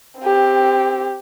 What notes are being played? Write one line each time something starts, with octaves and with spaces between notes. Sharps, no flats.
C4 G4